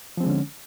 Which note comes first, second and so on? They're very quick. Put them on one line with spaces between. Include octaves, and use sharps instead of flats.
F3 C4 G#3 D3 C#4